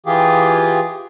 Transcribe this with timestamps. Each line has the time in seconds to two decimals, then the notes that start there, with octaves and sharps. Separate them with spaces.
0.06 E3 F4 G4 G#4